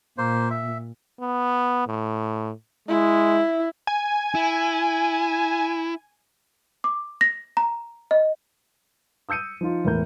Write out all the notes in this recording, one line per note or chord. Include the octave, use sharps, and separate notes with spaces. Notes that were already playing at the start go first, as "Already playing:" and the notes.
A#2 A#3 C5
E5
B3
A2
G#3 E4
G#5
E4
D6
A#6
A#5
D#5
D#6 E6 G6 C#7 D#7
F3 D#4 F4
E1 E2 A2 A#4 A#5 G6